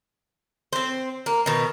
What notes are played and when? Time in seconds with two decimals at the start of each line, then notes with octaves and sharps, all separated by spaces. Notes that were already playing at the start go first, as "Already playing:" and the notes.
0.73 C4 C5
1.26 A#3
1.46 B2 D#3